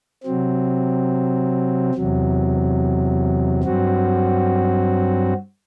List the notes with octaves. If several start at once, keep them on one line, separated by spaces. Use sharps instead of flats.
C3 F#3 C4
E2 C3 F#3
G2 F#3 C4 F#4